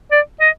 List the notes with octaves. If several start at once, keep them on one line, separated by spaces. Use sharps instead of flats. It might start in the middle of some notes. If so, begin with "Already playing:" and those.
D5
D#5